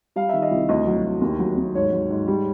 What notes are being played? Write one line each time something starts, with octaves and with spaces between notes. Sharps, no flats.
G3 F5
D#3 E5
D#5
C2
D2 D#5
F#3
D2
D#2
F#3
D#2
G#2 C#5
F#3
G#2
G3